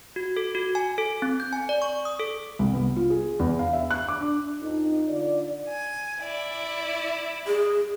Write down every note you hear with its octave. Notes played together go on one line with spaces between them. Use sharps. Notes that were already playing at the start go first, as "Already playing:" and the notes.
F#4
A4
F#4
G#5
A4
C4
G6
G#5
D5
C#6
D#6
A4
C2
B3
F4
G#4
E2
F5
E5
F#6
D6
D4
F2 D#4
D3 F4 D5
G#5
E4 D5
G#4